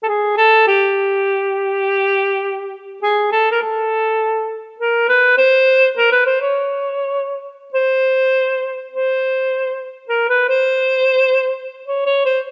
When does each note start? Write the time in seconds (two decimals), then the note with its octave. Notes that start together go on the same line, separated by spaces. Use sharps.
0.03 A4
0.08 G#4
0.37 A4
0.67 G4
3.03 G#4
3.32 A4
3.51 A#4
3.62 A4
4.80 A#4
5.08 B4
5.38 C5
5.97 A#4
6.12 B4
6.26 C5
6.42 C#5
7.74 C5
8.92 C5
10.09 A#4
10.29 B4
10.49 C5
11.86 C#5
12.06 C#5
12.25 C5